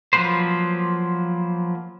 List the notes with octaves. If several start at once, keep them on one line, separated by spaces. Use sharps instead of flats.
F3 F#3 A#3 B4 C5